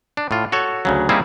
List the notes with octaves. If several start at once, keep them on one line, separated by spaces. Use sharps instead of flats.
D4
A2 F4
F#4 A4 C#5
D2 C#3 F#3
G3 A#3 C4 D#4 E4 G#4